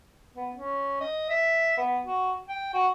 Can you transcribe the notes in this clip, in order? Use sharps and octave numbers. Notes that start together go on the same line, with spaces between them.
B3
C#4
D#5
E5
B3
F#4
G5
F#4